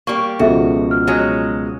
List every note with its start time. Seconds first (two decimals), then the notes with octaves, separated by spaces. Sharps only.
0.07 G3 A#3 C#6
0.39 C#2 B2 F3 F#4 G#4 A4 E5
0.91 F6
1.07 F#3 G#3